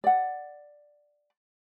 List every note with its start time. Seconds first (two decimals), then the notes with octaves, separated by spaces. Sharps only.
0.04 D5 F#5